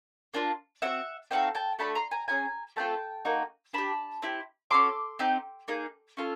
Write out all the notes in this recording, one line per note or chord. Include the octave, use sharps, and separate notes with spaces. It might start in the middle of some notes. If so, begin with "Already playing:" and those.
A#3 D4 F4
C4 D#4 F#4 E5 F#5
C4 D#4 F#4 A4 F5 G5
G5 A5
A3 D4 F#4 A4 A5 B5
A#5 C6
G#5 A#5
C#4 E4 G#4 G#5 A#5
A3 C4 F4 A4 G5 A5
A#3 D#4 F#4
D4 G4 A5 B5
C4 E4 G4
C#4 F#4 A4 C6 D6
C4 D#4 G4
A#3 D#4 G#4
C#4 F4 A4